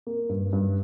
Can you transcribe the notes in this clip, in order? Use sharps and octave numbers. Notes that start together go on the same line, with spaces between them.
A#3
G2
G2